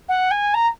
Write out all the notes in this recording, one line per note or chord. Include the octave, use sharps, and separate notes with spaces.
F#5
G#5
A#5